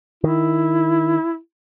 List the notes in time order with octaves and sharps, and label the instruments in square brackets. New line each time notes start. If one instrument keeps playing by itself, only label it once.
[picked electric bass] D#3 [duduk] E4